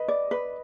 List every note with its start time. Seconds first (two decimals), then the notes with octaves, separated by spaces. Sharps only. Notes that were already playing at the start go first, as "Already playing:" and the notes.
Already playing: B4 D#5
0.08 D5
0.31 B4